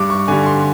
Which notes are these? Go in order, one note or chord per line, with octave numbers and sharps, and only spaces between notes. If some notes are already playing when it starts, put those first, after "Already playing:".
Already playing: G2 D6
C#6
D3 G3 G#5
C6